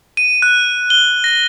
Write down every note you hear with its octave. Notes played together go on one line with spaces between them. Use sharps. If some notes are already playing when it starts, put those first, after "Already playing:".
D#7
F#6
G7
A#6